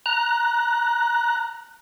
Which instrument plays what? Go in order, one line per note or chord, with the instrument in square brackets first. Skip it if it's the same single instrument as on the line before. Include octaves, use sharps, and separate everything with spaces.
[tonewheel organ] A#5 F#6